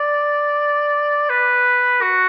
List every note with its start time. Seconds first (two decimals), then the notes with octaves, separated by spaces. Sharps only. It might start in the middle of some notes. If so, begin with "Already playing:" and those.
Already playing: D5
1.30 B4
2.02 F#4